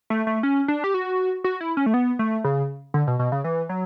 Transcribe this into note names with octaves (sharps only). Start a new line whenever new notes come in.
A3
A3
C#4
D4
G4
F#4
F#4
E4
C#4
A3
B3
A3
C#3
D3
B2
B2
C#3
E3
F#3